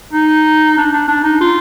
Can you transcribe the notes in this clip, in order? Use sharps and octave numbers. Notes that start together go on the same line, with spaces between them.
D#4
D4
D4
D4
D#4
F4